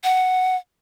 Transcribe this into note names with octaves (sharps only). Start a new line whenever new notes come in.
F#5